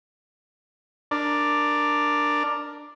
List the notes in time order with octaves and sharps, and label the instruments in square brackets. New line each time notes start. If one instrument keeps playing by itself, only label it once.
[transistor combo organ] D4 A#4 D5